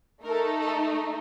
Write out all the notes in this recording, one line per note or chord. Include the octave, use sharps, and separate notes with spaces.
A3 D#4 A4 A#4
A4